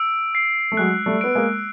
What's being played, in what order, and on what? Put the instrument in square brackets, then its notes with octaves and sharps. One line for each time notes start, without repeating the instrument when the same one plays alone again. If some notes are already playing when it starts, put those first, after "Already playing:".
Already playing: [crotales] E6 D7
C7
[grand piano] A3
[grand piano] F#3 G#3 [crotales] F#6
[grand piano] G3 A3
[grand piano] B3 [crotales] D7
[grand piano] G#3 A#3